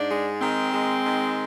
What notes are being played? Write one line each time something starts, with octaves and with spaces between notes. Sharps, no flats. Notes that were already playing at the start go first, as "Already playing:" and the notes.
Already playing: G#2 D4
G#3
D#3 C4
G#3
D#3